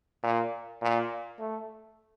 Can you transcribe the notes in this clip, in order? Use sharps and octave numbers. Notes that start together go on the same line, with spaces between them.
A#2
A#2
A3